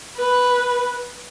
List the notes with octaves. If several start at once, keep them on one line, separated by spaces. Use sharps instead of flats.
B4